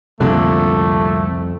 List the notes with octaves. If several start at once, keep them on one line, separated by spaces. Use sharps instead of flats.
C2 F2 A#2 D3 A3